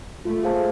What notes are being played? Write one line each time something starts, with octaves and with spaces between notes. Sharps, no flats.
A3 F4
G#4 C5 F5 A5